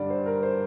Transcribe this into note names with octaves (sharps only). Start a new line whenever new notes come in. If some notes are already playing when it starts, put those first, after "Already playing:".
Already playing: G2 D3 G3 D5
C5
A#4
C5